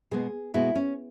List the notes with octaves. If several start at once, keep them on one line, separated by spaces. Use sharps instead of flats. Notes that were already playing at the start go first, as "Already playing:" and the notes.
B2 G#3 B3 G#4
B2 G#3 B3 E4
C#4